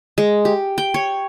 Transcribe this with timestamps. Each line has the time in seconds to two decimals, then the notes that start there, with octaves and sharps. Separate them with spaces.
0.18 G#3
0.45 G4
0.78 G5
0.94 C#5